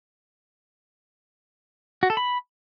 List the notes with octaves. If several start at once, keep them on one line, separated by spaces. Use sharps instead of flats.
F#4
A4
B5